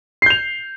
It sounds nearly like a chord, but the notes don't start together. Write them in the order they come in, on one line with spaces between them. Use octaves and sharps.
C7 G6 F7